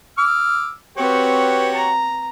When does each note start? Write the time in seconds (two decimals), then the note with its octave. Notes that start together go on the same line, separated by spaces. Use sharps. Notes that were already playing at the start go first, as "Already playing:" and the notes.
0.18 D6 E6 F6
0.97 C4 F#4 G4 B4 C#5
1.74 A#5